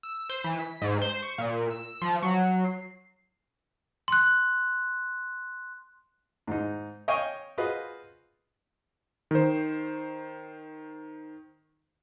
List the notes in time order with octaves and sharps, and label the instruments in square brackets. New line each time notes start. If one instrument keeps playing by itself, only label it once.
[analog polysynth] E6
C5
E3
B6
G#2
C5
C#6
A#2
E6
F3
F#3
C7
[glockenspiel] C6 F#6
[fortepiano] G#2 D#4
C#5 D#5 F5 G5 G#5 C#6
F4 F#4 G#4 B4 C5 D#5
[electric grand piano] D#3 C5